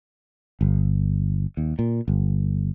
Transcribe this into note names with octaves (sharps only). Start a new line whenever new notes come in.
G1
D#2
A#2
G1